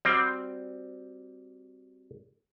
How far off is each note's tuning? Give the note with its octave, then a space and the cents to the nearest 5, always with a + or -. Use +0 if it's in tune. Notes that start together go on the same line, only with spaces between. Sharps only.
G3 +0 C4 +0 F#4 +0